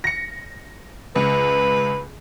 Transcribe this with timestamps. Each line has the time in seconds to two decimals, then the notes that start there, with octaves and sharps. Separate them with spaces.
0.04 A#6 C#7
1.16 C#2 B4